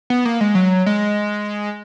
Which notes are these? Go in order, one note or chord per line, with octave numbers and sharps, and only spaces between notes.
B3
A#3
G#3
F#3
G#3